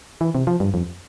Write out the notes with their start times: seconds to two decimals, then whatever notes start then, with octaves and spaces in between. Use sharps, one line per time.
0.21 E3
0.35 C3
0.47 F3
0.60 G2
0.74 F2